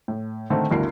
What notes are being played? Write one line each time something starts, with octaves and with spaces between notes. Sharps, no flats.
A2
D3 D#3 A3 C4
G1 D2 D4 E4 A#4 C7